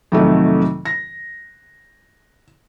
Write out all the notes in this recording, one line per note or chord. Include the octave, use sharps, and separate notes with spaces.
F2 C3 D#3 F#3 A3
A#6